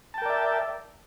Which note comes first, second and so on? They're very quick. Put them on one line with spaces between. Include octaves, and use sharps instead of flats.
A5 G5 A#4 D5 E5